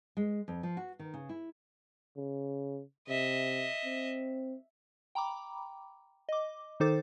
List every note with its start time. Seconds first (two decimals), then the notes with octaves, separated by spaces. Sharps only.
0.17 G#3
0.48 F2
0.63 F3
0.77 F#4
0.99 D#3
1.14 C#3
1.29 E4
2.17 C#3
3.08 C3 D#5 E5
3.85 C4
5.15 G5 A#5 B5 D6
6.29 D#5 D6
6.80 D#3 D#4 A4 C5 D6 A6